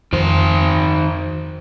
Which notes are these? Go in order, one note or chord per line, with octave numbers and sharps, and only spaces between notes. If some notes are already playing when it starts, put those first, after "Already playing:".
F2 D#3 C5